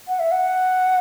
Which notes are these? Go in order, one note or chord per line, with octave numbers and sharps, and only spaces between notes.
F#5
E5
F#5